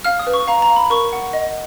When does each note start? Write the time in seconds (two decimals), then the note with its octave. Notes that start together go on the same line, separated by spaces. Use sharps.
0.04 F5 F6
0.19 D#6
0.27 B4
0.33 C#6
0.48 F5 A#5
0.62 A#5
0.70 F5
0.76 B5
0.90 A#4 C#6
1.13 F#5
1.33 D#5